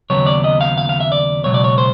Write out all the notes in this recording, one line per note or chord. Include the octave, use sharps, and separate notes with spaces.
D#2 C#3 F#3 B3 C#5
D5
D#5
F5
F5
F5
E5
D5
C#2 B2 F#3 C#5
D5
C#5
C5